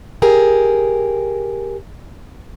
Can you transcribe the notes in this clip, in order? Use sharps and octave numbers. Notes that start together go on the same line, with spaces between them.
G4 G#4 A#4